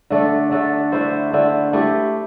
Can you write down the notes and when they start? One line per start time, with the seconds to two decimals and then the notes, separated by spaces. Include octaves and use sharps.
0.10 D3 A3 D4 A4
0.51 D3 A3 D4 A4
0.92 D3 A3 E4 C5
1.32 D3 A3 E4 C5
1.73 A3 E4 G4